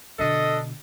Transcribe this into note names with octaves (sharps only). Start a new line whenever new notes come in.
B2 D3 D4 A4 D#5